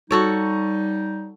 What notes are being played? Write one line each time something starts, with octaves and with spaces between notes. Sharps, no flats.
G3 D#4 F#4 A4 C#5